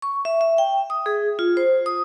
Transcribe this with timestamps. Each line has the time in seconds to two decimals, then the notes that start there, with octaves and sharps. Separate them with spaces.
0.02 C#6
0.25 E5
0.41 E5
0.58 G5
0.90 D#6
1.06 G#4
1.39 F4
1.57 C5
1.86 D#6